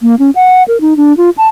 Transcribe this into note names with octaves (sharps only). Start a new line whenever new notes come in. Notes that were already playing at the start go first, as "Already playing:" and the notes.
A#3
C#4
F#5
A#4
D#4
D4
F4
A5